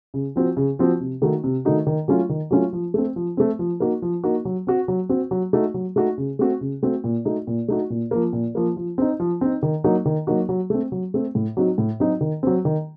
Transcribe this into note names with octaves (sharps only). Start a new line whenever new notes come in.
C#3
F3 C4 F#4
C#3
F3 C4 F#4
C3
D#3 A3 D#4 F#4
C3
D#3 A3 D#4 F#4
D#3
F#3 A3 C#4 F4
D#3
F#3 A3 C#4 F4
F3
A3 C4
F3
A3 C4
F3
A#3 D#4 F#4
F3
A#3 D#4 F#4
F#3
C4 F#4
F#3
C4 F#4
F#3
A3 D#4 F#4
F#3
A3 D#4 F#4
C#3
A3 C4 F#4
C#3
A3 C4 F#4
A#2
A3 D#4 F#4
A#2
A3 D#4 F#4
A#2
F3 A#3
A#2
F3 A#3
F3
C4 D#4
F3
C4 D#4
D#3
F#3 A#3 D#4 F#4
D#3
F#3 A#3 D#4 F#4
F#3
A3 C4
F#3
A3 C4
A2
F#3 C4 D#4 F#4
A2
F#3 C4 D#4 F#4
D#3
F#3 C4
D#3